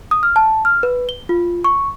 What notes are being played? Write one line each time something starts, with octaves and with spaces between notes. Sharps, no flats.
D#6
F6
A5
F6
B4
G7
F4
C#6